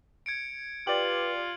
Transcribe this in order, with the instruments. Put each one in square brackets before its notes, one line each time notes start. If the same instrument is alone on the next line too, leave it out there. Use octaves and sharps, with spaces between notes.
[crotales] G#6 C#7 D7
[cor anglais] F4 [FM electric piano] G4 D5 [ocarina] B4 [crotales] F#7